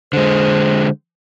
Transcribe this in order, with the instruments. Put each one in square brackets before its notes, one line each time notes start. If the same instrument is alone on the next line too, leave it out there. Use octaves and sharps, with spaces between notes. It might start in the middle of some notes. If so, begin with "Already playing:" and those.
[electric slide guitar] D3 G#3 [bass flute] C5